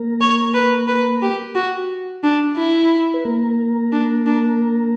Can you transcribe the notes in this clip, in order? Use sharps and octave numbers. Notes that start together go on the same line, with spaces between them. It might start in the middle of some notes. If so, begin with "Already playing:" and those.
Already playing: A#3 A#4
C#5
B4
B4
G4
F#4
D4
E4
B4
A#3 A#4
D4
D4